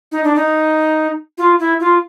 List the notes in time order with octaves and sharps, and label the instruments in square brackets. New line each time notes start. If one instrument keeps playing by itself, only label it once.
[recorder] D#4
D4
D#4
F4
E4
F4